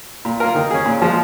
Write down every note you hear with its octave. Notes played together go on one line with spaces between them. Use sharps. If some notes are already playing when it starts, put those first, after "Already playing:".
A#2
A#3 F4 A#4
D#3
C#4 G#4
A#2
F3 G#3